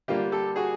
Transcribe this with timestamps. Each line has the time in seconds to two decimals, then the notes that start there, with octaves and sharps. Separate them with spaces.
0.08 D3 G3 A#3 D4 F4 G4
0.32 G4 A4
0.56 F#4 G#4